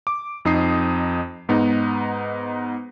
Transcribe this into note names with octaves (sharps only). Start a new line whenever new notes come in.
D6
F2 D#4 D#6 C7
G#2 B3 D#4